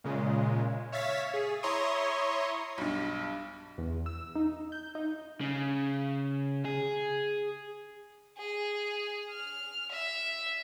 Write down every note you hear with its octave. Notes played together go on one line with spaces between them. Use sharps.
A#2 C#3 G#3
C#5 E5 F5 A6 B6
G#4
E4 C#5 A#5 C6 C#6 D#6
B1 G2
E2
E6
D#4
G6
D#4
C#3
G#4
G#4
F6
E5